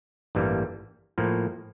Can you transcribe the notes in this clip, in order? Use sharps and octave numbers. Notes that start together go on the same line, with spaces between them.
A1 G2 E3 G3 A#3
A2 F3 A#3